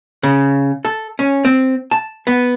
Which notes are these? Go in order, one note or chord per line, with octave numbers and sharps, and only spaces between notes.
C#3
A4
C#4
C4
A5
B3